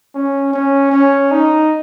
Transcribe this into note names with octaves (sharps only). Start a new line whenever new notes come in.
C#4
C#4
C#4
D#4